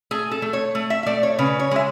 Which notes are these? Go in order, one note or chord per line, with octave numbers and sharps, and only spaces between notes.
A3 G#4
A4
A3
C#5
A3
E5
E5
A3 D5
C#5
C#3 B4
C#5
G#3 E5